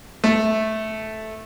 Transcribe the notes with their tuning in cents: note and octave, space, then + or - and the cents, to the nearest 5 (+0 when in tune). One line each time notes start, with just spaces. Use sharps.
A3 -10